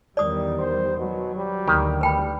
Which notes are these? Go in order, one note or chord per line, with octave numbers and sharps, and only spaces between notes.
E2 D#3 G3 D5 D#6
C5
B2 F#3
G3
D2 D#3 A#3 G4
G3 B4 G5 B5